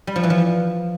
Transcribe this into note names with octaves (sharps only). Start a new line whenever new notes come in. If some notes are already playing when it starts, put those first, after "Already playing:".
G3
F3
E3
F3